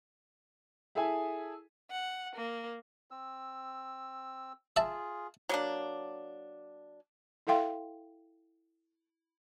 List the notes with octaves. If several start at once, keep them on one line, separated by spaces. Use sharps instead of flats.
E4 G#4 A4 E5 G#5
F#5
A#3
C4 E6
F4 G#4 E5 A5
F#3 A#3 D4
E4 A4 E5 F5 G5 C6